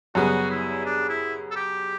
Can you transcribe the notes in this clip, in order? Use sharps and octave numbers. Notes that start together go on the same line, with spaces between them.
F#2 C#3 G3 B3 F#4
E4
D4
E4
A4
G4